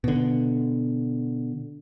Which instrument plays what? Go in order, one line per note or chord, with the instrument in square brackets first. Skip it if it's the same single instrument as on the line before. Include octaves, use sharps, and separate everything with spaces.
[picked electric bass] B2 D3